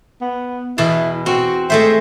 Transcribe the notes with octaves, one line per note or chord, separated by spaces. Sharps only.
B3
E2 B2 E4 A5
C4 F#4
G#3 A3 C5 E5